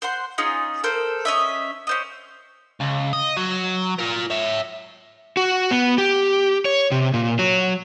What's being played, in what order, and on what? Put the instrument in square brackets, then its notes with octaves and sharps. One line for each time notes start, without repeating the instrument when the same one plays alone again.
[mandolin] C5 F#5 C6
C#4 D#4 F4 G#4
A4 A#4 C5
C#4 D#5 E5
C#4 C5 D#5
[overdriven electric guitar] C#2
D#5
F#3
F4 A#4
C#5 E5
[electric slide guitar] F#4
B3
G4
C#5
C3
A#2
F#3